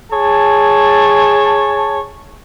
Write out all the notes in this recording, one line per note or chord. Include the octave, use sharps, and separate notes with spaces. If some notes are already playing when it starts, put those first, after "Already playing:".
G#4 C#5 A5